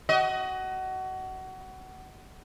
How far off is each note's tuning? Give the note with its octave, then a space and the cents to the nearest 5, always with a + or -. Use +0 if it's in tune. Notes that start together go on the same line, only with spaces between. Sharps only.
F#4 +25 D#5 +15